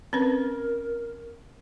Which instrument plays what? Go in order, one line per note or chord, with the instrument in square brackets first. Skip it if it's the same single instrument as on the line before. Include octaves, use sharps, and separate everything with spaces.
[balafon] C4 C#4 B4 [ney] A#4